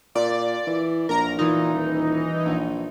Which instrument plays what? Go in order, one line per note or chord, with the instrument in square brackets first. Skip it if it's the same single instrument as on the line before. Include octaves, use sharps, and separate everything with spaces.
[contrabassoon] A#2 [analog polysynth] D5
[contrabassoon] E3
[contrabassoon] A#1 [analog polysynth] A#4 A#5
[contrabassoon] A#2 [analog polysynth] E3 D#4
[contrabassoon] D#1
A#1